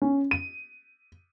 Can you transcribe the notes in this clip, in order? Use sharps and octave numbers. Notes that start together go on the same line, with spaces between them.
C#4
D#7